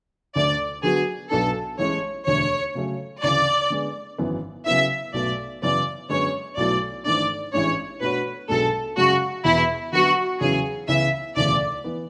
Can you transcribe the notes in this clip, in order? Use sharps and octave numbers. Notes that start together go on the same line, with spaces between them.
D2 D3 A3 D5
D3 F#3 B3 F#4 G#4
B1 B2 F#3 B3 D4 A4
A1 A2 G#3 C#4 C#5
E1 D2 D3 A3 D4 C#5
C#3 F#3 A3 C#4
D2 C#3 E3 D5
D3 G#3 B3
G#1 F#2 E3 B3
C#3 F#3 B3 E4 E5
B1 B2 A3 D5
F#2 C#3 E3 B3 D5
F#2 D3 G#3 B3 C#5
B1 B2 F#3 A3 E4 D5
G#1 G#2 E3 A3 D4 D5
A1 A2 E3 G#3 D4 C#5
B2 A3 D4 F#4 B4 C#5
B1 B2 G#3 D4 A4
F#2 C#3 G#3 C#4 F#4
E1 E2 B2 E4
D3 F#3 B3 F#4
E2 C#3 F#3 C#4 E4 G#4
C#2 C#3 E3 B3 E4 E5
E1 D2 C#3 E3 A3 D5
E3 B3